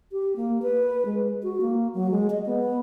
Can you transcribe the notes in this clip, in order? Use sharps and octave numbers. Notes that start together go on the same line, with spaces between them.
G4
A#3
B4
G#3
F#4
A#3
F#3
G#3
D#5
B3